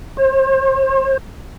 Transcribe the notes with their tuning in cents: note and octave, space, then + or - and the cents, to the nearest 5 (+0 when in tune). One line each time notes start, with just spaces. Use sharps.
C5 +40